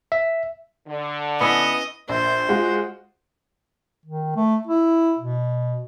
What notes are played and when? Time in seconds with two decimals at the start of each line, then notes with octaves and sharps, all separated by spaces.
0.12 E5
0.87 D3
1.41 B3 C#4 E4 D#5 E5
2.09 A#1 C5
2.49 G#3 F4 F#4
4.06 D#3
4.36 A3
4.67 E4
5.19 B2